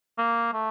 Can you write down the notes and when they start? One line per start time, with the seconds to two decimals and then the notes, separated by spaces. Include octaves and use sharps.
0.18 A#3
0.54 A3